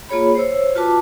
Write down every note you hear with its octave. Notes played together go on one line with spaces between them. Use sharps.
A#3 F4 G#4 C#5 B5
C5 C#5 E6
F4 F#4 B4 A5 D6